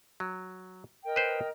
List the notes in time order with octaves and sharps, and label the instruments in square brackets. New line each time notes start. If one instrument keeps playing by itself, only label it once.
[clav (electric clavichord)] F#3
[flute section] A#4 D#5 G5
[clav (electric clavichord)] B4 C5